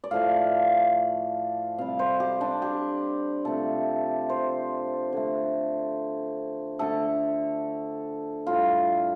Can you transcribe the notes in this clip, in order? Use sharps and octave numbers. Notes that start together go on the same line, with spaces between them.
D5
A2 F3 A3 F5
C3 G3 F5
C5
G4
D4
G4
C3 F3 A3 A4
C5
D3 A3
D3 A3 A4
A2 G3 F4